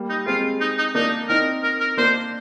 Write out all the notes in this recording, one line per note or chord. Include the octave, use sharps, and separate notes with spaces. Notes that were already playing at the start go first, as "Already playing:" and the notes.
Already playing: G3 A#3
D#4
G#3 C4 F4
D#4
D#4
A#3 D4 D#4
C4 D#4 A#4
A#4
A#4
A#3 D4 C5